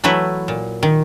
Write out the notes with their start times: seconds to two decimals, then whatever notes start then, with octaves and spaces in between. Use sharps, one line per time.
0.04 E3 F#3 A3 E4 B4
0.48 A#2
0.83 D#3